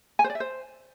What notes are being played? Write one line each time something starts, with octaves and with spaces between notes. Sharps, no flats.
G#5
C5
D5
E5
C5